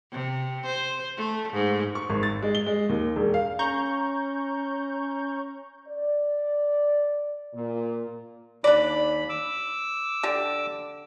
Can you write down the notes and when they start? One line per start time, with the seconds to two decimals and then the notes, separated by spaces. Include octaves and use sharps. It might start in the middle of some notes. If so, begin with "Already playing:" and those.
0.12 C3
0.66 C5
1.17 A3
1.53 G#2
1.95 C#6
2.10 G#1
2.23 A6
2.42 G#3
2.55 G7
2.66 G#3
2.89 D#2
3.16 E1
3.34 F5
3.59 C#4 A#5 C#6 G6
5.88 D5
7.55 A#2
8.64 D#2 D4 D5 B5
9.29 D6 E6
10.23 D3 G4